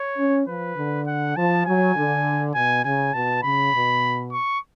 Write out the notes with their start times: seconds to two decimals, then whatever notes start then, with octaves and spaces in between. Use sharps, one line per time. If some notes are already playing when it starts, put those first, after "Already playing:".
Already playing: C#5
0.18 C#4
0.47 F3 B4
0.76 D3
1.07 F#5
1.36 F3 A5
1.65 F#3 G#5
1.95 D3
2.55 B2 G#5
2.84 C#3 G#5
3.14 B2 A5
3.43 C#3 B5
3.73 B2
4.32 C#6